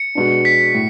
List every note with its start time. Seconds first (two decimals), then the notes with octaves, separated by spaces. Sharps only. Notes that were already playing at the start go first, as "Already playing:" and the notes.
Already playing: C#7
0.15 B2 G#3 B3 D4
0.45 B6
0.74 A2